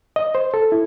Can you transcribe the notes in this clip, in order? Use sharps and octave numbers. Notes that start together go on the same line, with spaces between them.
D#5
C5
A4
E4